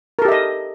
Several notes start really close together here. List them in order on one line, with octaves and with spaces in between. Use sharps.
A#4 A4 G4 E5 D#5